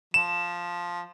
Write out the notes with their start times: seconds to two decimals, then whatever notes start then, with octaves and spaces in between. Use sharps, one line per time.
0.14 F3 E7